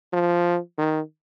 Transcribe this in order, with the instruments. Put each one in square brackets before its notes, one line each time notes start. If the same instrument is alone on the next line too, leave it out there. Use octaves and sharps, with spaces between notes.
[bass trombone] F3
D#3